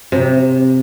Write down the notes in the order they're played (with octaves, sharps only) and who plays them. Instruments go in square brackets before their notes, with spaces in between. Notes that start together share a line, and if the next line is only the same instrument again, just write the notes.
[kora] C3